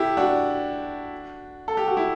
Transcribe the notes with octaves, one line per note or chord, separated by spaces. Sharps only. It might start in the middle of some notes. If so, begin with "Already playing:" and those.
Already playing: E4 G4 A4
D4 F#4
A4
G4
F#4
E4